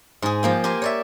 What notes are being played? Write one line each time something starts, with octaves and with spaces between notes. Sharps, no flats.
G#2 G#4
F3 A#3 G5
G4 A#4 C5 G#5
C#5 D5 E5